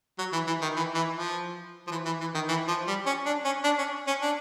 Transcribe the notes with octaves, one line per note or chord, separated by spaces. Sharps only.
F#3
E3
E3
D#3
E3
E3
F3
F3
E3
E3
E3
D#3
E3
F3
G3
C#4
D4
C#4
D4
C#4
C#4
D4